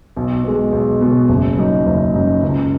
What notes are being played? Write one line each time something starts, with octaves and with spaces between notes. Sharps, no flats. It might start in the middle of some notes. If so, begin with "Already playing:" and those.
B1
B2 G#3
B1
B2 G#3
F#1
F#2 F#3 D#4
F#1
F#2 F#3 D#4
C#2